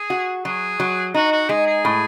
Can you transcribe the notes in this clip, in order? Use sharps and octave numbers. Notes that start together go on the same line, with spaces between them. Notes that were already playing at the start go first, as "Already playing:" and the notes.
Already playing: G#4
F#4
F#3 G#4
F#3
D#4 F#4
F#4
G#3 G#4
G#4
A2